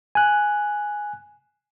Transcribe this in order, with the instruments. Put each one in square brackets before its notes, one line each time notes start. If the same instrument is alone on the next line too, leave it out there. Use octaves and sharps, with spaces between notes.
[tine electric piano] G#5 F#6